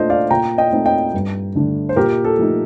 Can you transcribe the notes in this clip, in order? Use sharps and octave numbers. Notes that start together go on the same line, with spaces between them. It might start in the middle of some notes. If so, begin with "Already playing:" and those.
Already playing: A#2 A3 D4 F4 C5 D#5
D5 F5
A#2 G5 A#5
D#5 G5
A3 C4 D#4
D#5 G5
G2
D3 A3 D4
C5
A#2 G4 A#4
A4
F3 A3 D#4